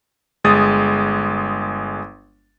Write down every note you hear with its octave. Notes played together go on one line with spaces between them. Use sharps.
G1 G#3 D#6 A6